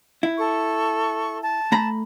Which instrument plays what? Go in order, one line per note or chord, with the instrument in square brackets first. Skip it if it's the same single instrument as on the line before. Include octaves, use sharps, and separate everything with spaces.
[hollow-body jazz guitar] E4
[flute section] A4 C#6
A5
[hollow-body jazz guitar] A3 A#5 B5